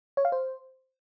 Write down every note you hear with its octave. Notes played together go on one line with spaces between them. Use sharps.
C#5
F5
C5